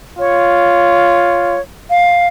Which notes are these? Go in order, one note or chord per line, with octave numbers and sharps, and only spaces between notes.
F4 C#5
F5